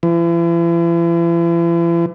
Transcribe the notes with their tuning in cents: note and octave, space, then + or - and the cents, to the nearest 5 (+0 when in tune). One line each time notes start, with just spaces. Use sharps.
E3 +45